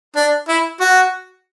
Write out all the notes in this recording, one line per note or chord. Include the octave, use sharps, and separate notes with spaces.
D4
E4
F#4